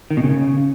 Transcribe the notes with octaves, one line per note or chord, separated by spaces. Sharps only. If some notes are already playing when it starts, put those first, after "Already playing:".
D#3
B2
C#3